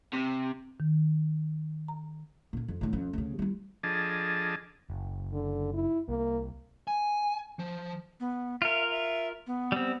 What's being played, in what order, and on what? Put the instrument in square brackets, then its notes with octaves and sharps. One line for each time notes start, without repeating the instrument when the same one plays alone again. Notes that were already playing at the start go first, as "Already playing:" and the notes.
[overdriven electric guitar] C3
[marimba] D#3
A#5
[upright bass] A#2 D3
F2
A2 D3
F2 C#4
D2 C#3
G3 E4
[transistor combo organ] F3 D4 G#4 A4 D#5 A5
[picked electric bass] F#1
[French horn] D3
E4
[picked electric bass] C2 [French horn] A#3
[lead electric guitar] G#5
F3
[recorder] B3
[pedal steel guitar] F4 A#4 [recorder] E5
[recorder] E5
B3
[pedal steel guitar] G3 C4